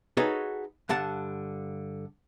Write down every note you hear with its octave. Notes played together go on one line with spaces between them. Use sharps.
D#4 F#4 G#4 A4 B4 C#5
G2 D3 F#5 A5